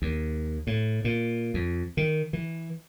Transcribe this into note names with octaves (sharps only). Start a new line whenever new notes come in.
D#2
A2
A#2
F2
D#3
E3